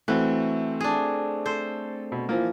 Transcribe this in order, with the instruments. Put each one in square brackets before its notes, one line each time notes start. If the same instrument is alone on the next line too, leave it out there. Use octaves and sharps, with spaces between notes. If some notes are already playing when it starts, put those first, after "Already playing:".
[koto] E3 [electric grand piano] A3 C4 [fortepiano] F#4 F#6
[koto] D4 G#4
[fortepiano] A4 [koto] C5
[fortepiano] B2
E3 F3 A#3